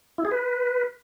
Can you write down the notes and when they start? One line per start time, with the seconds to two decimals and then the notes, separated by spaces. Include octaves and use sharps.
0.18 E4
0.25 G#4
0.31 B4